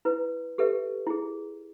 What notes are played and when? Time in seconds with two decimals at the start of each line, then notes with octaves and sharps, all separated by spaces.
0.05 E4 B4
0.58 G4 A4 B4 E5
1.07 E4 G#4